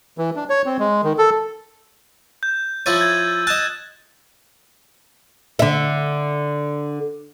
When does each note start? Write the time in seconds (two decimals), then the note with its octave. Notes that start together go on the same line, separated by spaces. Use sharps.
0.18 E3
0.36 D4
0.49 C#5
0.66 C4
0.79 G#3
1.03 D#3
1.18 A4
2.43 G6
2.86 F3 E4 C#5 E6 A6 D#7
3.01 G#6
3.47 D#5 A5 F#6 E7
5.59 D3 E5